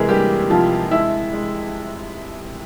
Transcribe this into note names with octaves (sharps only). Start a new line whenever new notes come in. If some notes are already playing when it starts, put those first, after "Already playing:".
Already playing: C3 E3 G#3 E4 G#4 A#4
G3 A#3 G4
C3 F3 F4
G#3 E4 E5
G#3